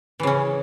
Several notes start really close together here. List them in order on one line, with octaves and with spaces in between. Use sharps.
E3 C#3 C#4